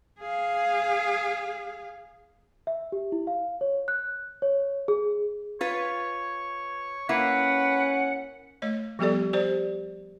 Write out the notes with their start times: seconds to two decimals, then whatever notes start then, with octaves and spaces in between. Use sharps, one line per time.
0.21 G#4 F5
2.67 E5
2.92 G4
3.12 E4
3.27 F5
3.61 C#5
3.88 F#6
4.42 C#5
4.88 G#4
5.61 F4 B4 C#5
7.09 A#3 C#4 E4 B4 F#5
8.62 A3 C#5 D#5
8.99 F3 G3 B3 G4 A4 D5
9.33 G4 C5 D5